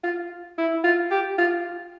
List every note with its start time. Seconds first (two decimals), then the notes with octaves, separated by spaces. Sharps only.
0.03 F4
0.58 E4
0.84 F4
1.11 G4
1.38 F4